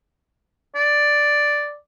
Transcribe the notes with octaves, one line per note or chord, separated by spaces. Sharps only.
D5